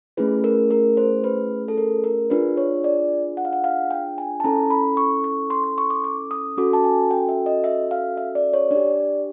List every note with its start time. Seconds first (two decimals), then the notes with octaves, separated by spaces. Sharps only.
0.17 A3 C#4 E4 G#4 B4
0.44 A#4
0.71 A#4
0.97 C5
1.24 B4
1.68 A4
1.78 A#4
2.04 A#4
2.30 D4 F4 G#4 B4
2.57 C#5
2.84 D5
3.37 F#5
3.45 F5
3.53 F#5
3.64 F5
3.91 G5
4.18 G#5
4.40 A5
4.44 C#4 E4 A4 A#5
4.70 B5
4.97 C#6
5.24 C#6
5.50 C6
5.64 C6
5.78 C#6
5.90 D6
6.04 D6
6.31 D#6
6.57 C#4 F#4 A4 D6
6.73 A5
6.84 G#5
7.11 G5
7.29 E5
7.46 D#5
7.64 E5
7.91 F5
8.17 E5
8.35 D5
8.54 C#5
8.71 D4 G4 D5